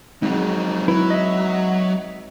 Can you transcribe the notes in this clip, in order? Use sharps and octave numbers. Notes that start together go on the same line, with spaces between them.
F2 F#3 G#3 C4 D#4
F#3 E4 B4
D#5 E5